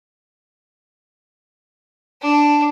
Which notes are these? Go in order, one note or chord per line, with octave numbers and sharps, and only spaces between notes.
D4